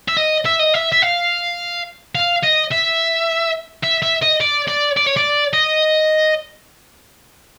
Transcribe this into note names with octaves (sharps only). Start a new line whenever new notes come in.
E5
D#5
E5
D#5
E5
E5
F5
F5
D#5
E5
E5
E5
D#5
D5
D5
D5
C#5
D5
D#5